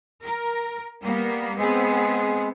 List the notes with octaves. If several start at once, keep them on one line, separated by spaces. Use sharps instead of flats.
A#4
G3 A#3 B3
G#3 B3 C4 G#4